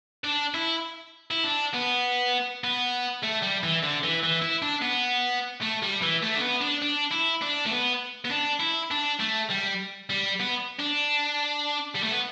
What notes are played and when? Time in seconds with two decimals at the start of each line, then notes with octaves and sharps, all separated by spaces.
0.24 D4
0.54 E4
1.31 E4
1.44 D4
1.74 B3
2.64 B3
3.23 A3
3.43 G3
3.64 E3
3.83 D3
4.03 E3
4.23 E3
4.42 E4
4.62 D4
4.82 B3
5.61 A3
5.82 G3
6.02 E3
6.22 A3
6.35 D4
6.41 B3
6.61 D4
6.82 D4
7.11 E4
7.42 D4
7.66 A3
7.71 B3
8.25 B3
8.31 D4
8.60 E4
8.91 D4
9.20 A3
9.51 G3
10.10 G3
10.40 B3
10.79 D4
11.95 G3
12.03 A3
12.11 B3